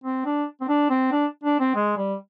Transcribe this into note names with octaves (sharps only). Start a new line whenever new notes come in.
C4
D4
C4
D4
C4
D4
D4
C4
G#3
G3